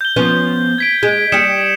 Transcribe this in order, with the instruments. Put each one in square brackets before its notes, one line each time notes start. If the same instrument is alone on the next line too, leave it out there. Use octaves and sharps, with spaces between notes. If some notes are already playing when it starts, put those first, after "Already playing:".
[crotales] G6 G7
[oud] F3 B3 C#4
[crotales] G#6 B6 D7
[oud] G#3
[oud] G3 G4 [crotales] D#6 C#7 E7